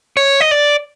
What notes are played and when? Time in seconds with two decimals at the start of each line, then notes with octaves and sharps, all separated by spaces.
0.17 C#5
0.40 D#5
0.51 D5